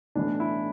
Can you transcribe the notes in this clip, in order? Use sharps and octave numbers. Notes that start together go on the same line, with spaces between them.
B1 A2 E3 D4
E4